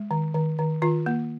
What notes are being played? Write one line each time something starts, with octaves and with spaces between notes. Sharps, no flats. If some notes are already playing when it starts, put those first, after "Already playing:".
Already playing: G#3
D#3
D#3
D#3
D#3 F4
A#3